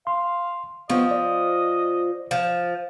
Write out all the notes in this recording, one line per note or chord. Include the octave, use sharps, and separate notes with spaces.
F5 C6
F3 B3 D#5 F5 C#6
D5
F3